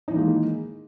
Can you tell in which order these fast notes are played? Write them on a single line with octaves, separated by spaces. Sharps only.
D#4 E3 D#3 A#3 G#3